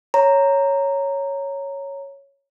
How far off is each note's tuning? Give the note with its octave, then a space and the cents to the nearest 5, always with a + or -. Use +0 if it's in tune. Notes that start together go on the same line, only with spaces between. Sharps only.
C#5 +0 A#5 -5